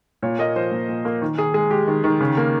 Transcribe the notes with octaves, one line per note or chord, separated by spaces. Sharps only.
A#2 C#5
A#3 D#5
F3 C5
A#2
A#2
A#3
D#3
D#3 G#4
G#3 G#4
G#3 G4
D#3
D#3
C#3
A#3